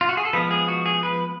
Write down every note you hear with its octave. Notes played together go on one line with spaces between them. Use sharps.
F4
F#4
G#4
A4
F3 G#3 B3 B4
G#4
F#4
G#4
B4